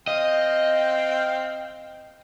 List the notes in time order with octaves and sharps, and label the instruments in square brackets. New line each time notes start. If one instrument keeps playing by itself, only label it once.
[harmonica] C4 F5 G5 [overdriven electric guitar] D#5